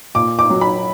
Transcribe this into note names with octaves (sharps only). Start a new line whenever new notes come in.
A#2 D6
D6
F#3
B5